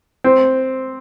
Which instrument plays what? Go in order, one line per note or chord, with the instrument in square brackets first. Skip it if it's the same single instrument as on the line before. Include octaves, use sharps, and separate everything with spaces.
[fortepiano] C4